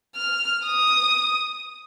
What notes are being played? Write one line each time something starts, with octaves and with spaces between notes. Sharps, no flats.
F6
D#6